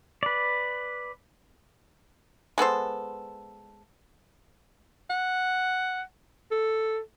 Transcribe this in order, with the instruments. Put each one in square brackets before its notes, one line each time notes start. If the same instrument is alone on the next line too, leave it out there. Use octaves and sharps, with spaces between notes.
[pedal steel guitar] B4 D5
[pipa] G#3 B3 A4 C5
[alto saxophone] F#5
A4